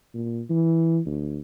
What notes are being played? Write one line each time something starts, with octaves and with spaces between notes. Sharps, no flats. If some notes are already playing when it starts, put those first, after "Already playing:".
A#2
E3
D2